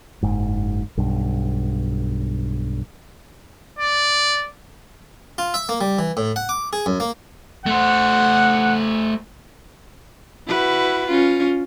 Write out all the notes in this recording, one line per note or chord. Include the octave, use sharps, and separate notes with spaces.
F#1 G#2
B1 G2
D5
F4
E5
A#3
G3
E3
A2
F#5
D6
G#4
F#2
A#3
A3 C5 F#5
E4 F#4 B4
C#4 F4